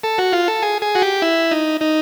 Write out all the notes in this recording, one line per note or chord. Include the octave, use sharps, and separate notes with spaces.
A4
F#4
F4
A4
G#4
G#4
F#4
G4
E4
D#4
D#4